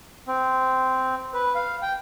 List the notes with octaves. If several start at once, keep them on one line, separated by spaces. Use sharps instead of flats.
C4
B4
F5
G5